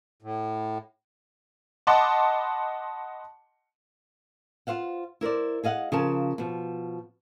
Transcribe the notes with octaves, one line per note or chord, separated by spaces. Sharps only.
A2
D#5 F#5 A5 B5 C6 D6
F4 A4 C5 F5 F#5
E4 A#4 C5 D5
G#4 D#5 F5 F#5
C#3 F3 G#4 A#4 F5 A5
B2 F3